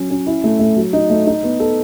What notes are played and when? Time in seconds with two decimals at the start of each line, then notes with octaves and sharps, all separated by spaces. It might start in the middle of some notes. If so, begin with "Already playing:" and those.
Already playing: F#3 C#4 F#4
0.10 C#4
0.27 E4
0.44 A3
0.59 A3
0.76 F#3
0.93 D#4
1.10 A3
1.27 D#4
1.43 B3
1.60 A4